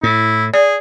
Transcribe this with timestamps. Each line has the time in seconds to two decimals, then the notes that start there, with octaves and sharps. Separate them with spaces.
0.03 A2 E4
0.54 G#4 D5